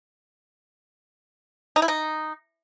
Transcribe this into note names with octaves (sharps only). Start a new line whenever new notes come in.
D#4
E4
D#4